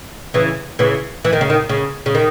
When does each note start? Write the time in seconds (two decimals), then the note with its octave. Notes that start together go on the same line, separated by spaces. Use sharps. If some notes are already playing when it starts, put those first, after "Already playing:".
0.34 C#3 E3
0.79 C#3 E3
1.25 E3
1.33 D#3
1.41 C#3
1.50 D#3
1.69 C#3
2.06 C#3
2.15 D#3